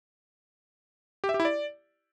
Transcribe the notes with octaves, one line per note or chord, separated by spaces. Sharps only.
G4
E5
G4
E4
D5